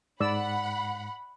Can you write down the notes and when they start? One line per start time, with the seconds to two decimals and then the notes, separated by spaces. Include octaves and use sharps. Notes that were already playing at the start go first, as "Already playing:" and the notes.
0.20 G#2 D5 F#5 B5 E6